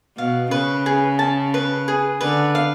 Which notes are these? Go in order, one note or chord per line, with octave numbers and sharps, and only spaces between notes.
B2 F5
C#3 B4
G#4
A5
B4
G#4
D3 B4
F5